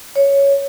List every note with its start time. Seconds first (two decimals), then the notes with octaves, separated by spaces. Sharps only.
0.16 C#5